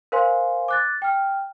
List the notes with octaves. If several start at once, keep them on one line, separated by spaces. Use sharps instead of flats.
A#4 C5 F5 G#5 C6
D6 F#6 A6
G5 F6